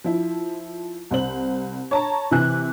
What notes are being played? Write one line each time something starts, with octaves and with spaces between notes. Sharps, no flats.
F3 E4
C2 C5 F#7
C#5 A5 A#5
C3 E3 E4 G#5 F#6